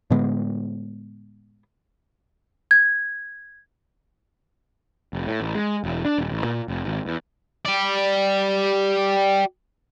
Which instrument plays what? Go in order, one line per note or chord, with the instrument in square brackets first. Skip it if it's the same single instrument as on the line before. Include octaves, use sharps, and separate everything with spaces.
[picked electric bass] A2 D3 G#3 B3
[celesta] G#6
[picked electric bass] F1
A2
A1
G#3
E1
D4
D#1
A1
A#2
F1
G#1
E2
[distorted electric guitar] G4 D5